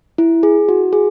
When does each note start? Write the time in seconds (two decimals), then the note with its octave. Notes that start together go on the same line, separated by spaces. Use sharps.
0.18 E4
0.43 G#4
0.69 F#4
0.93 G#4